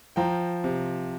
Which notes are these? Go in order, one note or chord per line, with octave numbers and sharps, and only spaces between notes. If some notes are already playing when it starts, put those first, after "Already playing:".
F3 G5 A#5
C3